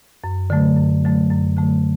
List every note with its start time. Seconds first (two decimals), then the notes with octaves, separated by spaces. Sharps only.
0.24 F#2
0.50 D3 F#3 A3
0.77 F#2
1.05 D3 F#3 A3
1.31 F#2
1.57 D3 F#3 A3